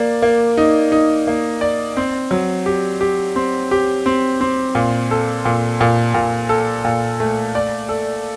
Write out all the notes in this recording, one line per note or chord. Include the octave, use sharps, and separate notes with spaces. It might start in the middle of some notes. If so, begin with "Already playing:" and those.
Already playing: A#3 D5
A#3
D#4
D#4
A#3
D5
C4
F#3
G4
G4
C4
G4
C4
C4
A#2
A4
A#2
A#2
A#2
A4
A#2
A3
D5
A4